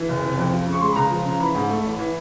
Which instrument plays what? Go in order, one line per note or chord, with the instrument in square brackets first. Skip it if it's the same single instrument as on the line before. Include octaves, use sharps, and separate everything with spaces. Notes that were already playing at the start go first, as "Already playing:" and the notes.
Already playing: [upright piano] E3
F#1
C3
F2
F3
C#3
C#6
G#3 C6
B5
C#2 A#5
F3
C#3
E3 B5
G#2
A3
A1
E3